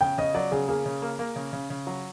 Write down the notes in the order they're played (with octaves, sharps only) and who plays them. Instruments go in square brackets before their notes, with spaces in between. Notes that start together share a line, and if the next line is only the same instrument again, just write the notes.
[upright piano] C#3 [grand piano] G5
[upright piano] C#3 [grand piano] D#5
[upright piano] F#3 [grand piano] D5
[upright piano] C#3 [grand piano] G#4
[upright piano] A#3 [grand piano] G#4
[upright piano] C#3
A#3
A#3
C#3
C#3
C#3
F#3